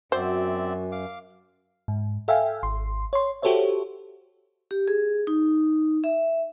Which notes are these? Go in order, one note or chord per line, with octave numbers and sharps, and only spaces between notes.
F#2 C4 F#4 C5 D5 E5
F5 D6
G#2
A4 E5 F5 G5 G#5
G#1 C6
C#5 C6
F#4 G4 A4 C5 C#5 E5
G4
G#4
D#4
E5